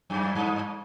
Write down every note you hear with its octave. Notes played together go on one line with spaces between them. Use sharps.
F#2
G2